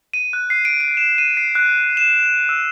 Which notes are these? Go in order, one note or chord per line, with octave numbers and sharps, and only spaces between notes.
D#7
F#6
C7
D7
D7
E7
D#7
C7
F#6
E7
E6